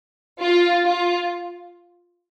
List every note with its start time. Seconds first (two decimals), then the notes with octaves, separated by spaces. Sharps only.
0.42 F4
0.84 F4